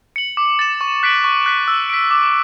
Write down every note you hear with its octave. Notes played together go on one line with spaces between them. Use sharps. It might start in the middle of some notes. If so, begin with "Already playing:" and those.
C#7 F#7
D6
A6 E7
C#6
F#6 B6 D7 F#7
C#6
F#6 B6
E6
B6 D7
D6